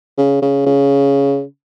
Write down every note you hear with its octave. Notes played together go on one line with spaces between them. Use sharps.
C#3
C#3
C#3